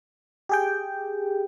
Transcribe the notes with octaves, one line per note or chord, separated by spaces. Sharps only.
G4 G#4 G5